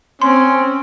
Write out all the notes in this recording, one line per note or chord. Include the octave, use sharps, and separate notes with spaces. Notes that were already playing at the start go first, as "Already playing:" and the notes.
C4 C#4 C6